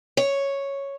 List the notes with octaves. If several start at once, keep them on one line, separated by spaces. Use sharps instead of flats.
C#5